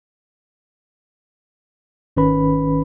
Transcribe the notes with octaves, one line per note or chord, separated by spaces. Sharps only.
G#1 D#3 C#4 B4 B5